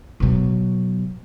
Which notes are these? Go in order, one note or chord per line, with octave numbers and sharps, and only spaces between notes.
B2 F#3